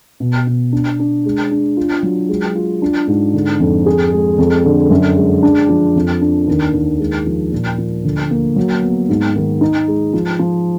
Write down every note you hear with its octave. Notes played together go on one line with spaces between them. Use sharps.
B2
B2
D4
D4
G#3
D4
F4
F#3
G#3
F4
D4
G#2
D3
F2
G#4
G#3
F2
D3
F#2
G#3
D4
F3
F2
D4
D#2
D#2
G#3
F3
A#2
F3
D2
A#3
F#3
B3
G#2
D#3
D#4
G#3
F3
F3